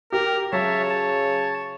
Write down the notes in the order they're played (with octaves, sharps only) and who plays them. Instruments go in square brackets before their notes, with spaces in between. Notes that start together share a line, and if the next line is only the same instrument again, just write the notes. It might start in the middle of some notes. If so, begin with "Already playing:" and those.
[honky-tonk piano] G4 [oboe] A#4
[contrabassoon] C#3 [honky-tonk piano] F#3 [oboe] C#5 [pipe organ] E5 A5
[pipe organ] A5